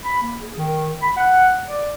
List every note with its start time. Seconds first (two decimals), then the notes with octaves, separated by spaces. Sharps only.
0.04 B5
0.22 A#3
0.41 G#4
0.58 D#3
1.02 B5
1.17 F#5
1.65 D5